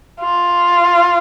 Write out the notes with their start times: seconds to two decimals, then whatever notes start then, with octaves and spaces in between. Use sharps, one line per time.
0.21 F4